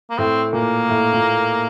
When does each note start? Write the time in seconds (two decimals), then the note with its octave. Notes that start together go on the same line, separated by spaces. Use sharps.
0.10 A#3
0.18 A2 C4
0.53 A#2 A#3
0.90 A2
1.14 A#2